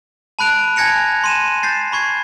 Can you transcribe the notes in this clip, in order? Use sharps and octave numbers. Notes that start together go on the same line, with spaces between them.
A5 B5 F#6 D7 F7
G#5 A5 G#6 A#6 C#7 F7
C6 D#7 E7
G6 A6 C7
B5 C#6 G#6 C7